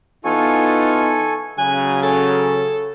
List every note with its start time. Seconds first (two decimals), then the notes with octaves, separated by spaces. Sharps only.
0.25 E3 B3 D#4 F4 A4 G#5 C#6
1.58 C#3 F#3 G#5 F#6
2.03 C#4 A4